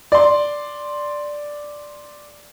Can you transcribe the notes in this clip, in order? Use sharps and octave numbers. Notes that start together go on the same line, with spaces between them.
D5 C6